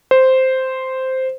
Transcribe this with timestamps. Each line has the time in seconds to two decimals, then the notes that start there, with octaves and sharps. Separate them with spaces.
0.11 C5